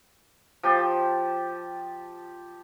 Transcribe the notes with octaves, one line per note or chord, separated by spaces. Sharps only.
F3 G4 G5 A5